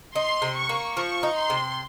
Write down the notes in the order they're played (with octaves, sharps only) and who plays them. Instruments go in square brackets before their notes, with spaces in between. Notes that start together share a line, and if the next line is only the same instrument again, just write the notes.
[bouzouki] D#4 [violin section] C6
[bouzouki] C3
[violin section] C#6
[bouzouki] A#3
[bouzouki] F3 [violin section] C#6
[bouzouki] D#4
[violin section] C6
[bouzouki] C3